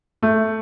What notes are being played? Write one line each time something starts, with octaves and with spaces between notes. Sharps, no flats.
A3